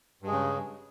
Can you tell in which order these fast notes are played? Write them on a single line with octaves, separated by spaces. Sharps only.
G2 G#3 C#3